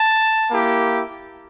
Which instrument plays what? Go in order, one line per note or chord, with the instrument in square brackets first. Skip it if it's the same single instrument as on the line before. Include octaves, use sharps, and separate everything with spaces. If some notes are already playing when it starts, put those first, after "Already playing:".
Already playing: [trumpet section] A5
A#3 E4 G4